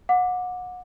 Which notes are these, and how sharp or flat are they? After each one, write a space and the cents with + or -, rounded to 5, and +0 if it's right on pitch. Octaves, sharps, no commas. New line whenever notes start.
F#5 -30 D6 +0